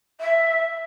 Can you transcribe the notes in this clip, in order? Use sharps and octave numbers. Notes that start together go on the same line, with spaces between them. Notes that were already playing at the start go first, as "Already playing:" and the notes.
E5